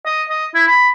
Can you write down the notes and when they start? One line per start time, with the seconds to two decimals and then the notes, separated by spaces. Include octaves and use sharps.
0.06 D#5
0.30 D#5
0.55 E4
0.67 B5